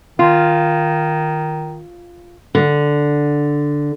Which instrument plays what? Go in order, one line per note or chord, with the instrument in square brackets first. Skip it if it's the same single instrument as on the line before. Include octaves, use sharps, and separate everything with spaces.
[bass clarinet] D#3 [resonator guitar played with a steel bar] F4
[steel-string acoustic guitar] D3